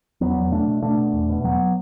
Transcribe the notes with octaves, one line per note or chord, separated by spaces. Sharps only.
E2 F#3 B3
E2
B2 A3 D4
B2
B2 A3 D4
B2
E2
B2
E2 F#3 B3